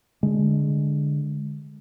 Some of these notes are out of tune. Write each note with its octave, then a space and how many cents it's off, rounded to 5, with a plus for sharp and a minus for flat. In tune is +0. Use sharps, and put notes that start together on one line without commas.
D3 +0 G#3 +0